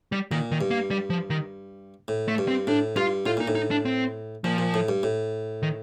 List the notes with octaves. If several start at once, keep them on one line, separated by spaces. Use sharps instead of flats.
G3
A#2 D#3
D#3
G2
A#3
G3
F3
D#3
A2
A3
G2
C4
A2 D4
G2 F4
A2 F4
A#2 D#4
A2
D#4
D4
C4
A#2 F3
A#2
A2
G2
A2
D#3